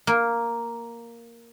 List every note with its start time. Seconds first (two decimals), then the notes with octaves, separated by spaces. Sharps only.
0.07 A#3